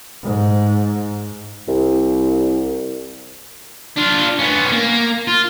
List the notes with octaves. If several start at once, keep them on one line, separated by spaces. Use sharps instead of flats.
G#2
C2
D4 F4
B3 C#4
A#3
F4